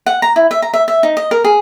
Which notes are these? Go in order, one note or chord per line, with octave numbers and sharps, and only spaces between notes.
F#5
A#5
E4
E5
A#5
E5
E5
D#4
D#5
A#4
G#4